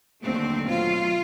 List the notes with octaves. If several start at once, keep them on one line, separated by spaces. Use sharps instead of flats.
D#2 D3 F#3 A3 C4
B2 F#3 A3 F4